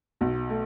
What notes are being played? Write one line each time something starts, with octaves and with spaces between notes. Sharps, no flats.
B1 F#4
A3